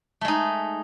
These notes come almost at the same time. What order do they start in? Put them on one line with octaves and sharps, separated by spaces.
A3 G#3 D#4